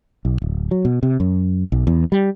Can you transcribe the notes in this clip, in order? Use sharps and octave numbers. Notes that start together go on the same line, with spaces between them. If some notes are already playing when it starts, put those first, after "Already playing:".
B1
D1
F#3
B2
C3
F#2
B1
E2
G3